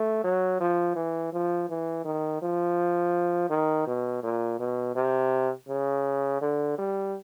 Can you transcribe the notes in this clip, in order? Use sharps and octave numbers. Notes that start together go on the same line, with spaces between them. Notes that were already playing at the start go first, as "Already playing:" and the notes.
Already playing: A3
F#3
F3
E3
F3
E3
D#3
F3
D#3
B2
A#2
B2
C3
C#3
D3
G3